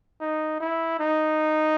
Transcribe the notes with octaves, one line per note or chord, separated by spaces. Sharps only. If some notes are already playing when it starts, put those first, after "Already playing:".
D#4
E4
D#4